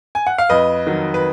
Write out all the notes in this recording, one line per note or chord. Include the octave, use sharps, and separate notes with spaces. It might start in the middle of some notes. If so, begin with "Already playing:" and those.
G#5
F#5
F5
F2 B4 D#5
D#3 F#3
B4